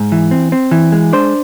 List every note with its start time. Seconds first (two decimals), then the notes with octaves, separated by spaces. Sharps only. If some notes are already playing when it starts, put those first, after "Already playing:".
Already playing: G#2
0.12 E3
0.31 C4
0.52 C4
0.71 E3
0.92 G#3
1.13 D4 C5